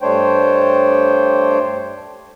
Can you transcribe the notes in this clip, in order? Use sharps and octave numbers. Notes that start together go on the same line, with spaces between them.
G2 A3 D4 C5 C#5 G5